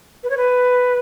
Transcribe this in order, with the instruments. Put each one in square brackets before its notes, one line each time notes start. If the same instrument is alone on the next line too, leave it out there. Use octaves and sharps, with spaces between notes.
[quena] B4
C#5
B4